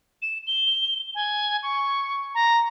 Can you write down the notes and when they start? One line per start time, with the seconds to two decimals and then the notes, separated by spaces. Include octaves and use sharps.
0.22 E7
0.47 G7
1.15 G#5
1.63 C#6
2.35 A#5